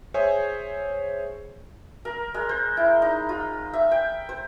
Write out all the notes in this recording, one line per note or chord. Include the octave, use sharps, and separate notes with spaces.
G#4 C5 C#5 E5 G#5
A#4
G#3
C5
E4
D#4
F4
E5
G5
C5